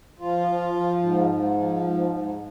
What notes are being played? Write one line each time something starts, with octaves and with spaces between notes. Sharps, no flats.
F3 F4
F3
F3
G#2
G#2
F3
G#2
G#2